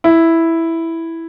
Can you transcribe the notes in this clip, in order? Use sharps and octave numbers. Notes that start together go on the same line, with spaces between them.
E4